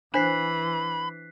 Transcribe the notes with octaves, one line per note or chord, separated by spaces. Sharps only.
E3 D4 C5 B5 F#6 B6 C7